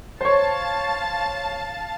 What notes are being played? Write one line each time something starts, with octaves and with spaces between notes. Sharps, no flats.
C5 C#5 F5 A5